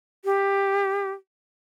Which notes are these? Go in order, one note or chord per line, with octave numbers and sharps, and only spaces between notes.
G4